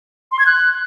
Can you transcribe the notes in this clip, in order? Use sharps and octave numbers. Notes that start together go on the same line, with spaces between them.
C6
G#6
F#6